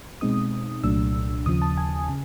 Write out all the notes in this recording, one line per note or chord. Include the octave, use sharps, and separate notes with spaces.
B2 G#3 C4 D#4 D#6
C2 A#2 F#3 A3 D4 E6
D#2 C#3 F3 D#6
A5
G#5
C#3